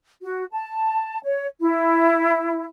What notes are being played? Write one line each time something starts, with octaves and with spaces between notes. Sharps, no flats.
F#4
A5
C#5
E4